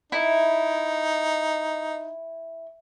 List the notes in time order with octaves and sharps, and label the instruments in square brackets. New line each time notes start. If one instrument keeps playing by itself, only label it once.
[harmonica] D#4 [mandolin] E4